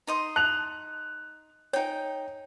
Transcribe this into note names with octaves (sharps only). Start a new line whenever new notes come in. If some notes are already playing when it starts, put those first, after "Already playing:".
D#4 D#5 C6
A5 F#6 F7
D#4 C#5 G5 G#5